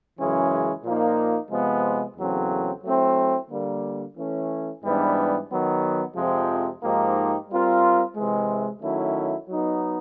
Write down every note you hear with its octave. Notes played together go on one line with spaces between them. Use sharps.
F#2 C#3 E3 G#3 C#4
A#2 F3 A#3 D#4
C3 F3 G#3 B3
E2 C#3 F#3 A3 C4
F#3 A3 C4 E4
D3 G3 A#3
E3 A3 C#4
G#2 E3 G3 B3 D4
D#3 F#3 B3
F2 C3 F3 G#3 C4
G#2 F3 A#3 D#4 G4
G3 C4 F4 A#4
C3 E3 G#3
D#3 F#3 A3 C#4 E4
F#3 B3 D#4